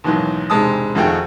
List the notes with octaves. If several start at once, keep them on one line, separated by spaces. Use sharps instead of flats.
D#2 G#2 B2 E3 F#3
E1 G#2 C3 G#3 A5 D#6
F2 D#3 A3 F#4 G#4 G5